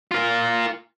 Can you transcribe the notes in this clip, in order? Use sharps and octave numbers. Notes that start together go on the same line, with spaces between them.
F4 A#4